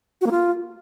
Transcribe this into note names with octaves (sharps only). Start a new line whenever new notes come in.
F#4
A#3
F4